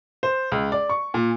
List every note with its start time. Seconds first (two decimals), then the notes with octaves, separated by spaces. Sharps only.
0.23 C5
0.52 C#2
0.72 D5
0.89 C#6
1.14 A#2